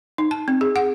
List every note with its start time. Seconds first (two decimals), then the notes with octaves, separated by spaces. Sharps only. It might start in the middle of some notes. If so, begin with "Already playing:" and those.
0.18 D#4
0.31 A5
0.48 C4
0.61 G#4
0.76 F#5